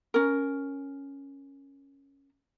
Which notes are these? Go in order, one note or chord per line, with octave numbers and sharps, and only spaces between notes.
C#4 A#4